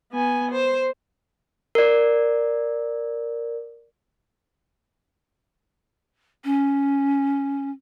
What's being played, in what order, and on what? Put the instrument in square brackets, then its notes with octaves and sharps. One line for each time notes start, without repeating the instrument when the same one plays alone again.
[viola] B3 G#5
C5
[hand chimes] A#4 D5
[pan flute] C#4